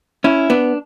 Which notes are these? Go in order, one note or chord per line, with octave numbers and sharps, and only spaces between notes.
C#4 E4
B3 D4